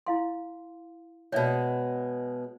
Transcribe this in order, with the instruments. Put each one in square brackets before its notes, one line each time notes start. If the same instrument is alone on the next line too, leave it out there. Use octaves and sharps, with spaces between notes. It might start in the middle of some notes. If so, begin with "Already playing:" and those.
[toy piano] E4 F5 C6
[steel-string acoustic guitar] B2 G#3 [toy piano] C#5 D5 E5